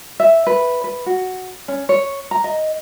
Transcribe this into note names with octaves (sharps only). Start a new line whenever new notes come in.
E5
B4
B4
F#4
C#4
C#5
A#5
D#5